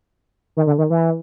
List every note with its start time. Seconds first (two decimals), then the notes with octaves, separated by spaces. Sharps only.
0.57 D#3
0.67 D3
0.78 D#3
0.90 E3